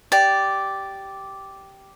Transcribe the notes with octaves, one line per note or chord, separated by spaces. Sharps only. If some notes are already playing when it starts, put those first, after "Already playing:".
G4 D5